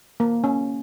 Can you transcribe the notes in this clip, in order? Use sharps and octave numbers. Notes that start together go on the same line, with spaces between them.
A#3
C#4